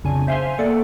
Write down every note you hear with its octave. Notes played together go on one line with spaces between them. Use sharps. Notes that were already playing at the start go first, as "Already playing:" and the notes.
B1 F2 C#3 D4 G#5
C5 E5 F5 G#5 C6
A#3 A4 D5 F#5